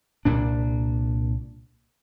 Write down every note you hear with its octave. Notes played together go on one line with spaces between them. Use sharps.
C2 A#2 D4